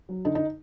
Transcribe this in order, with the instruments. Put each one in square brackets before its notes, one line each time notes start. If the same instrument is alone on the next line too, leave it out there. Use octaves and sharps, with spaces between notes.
[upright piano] F#3
[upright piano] D3 [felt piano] D#4
[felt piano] D#4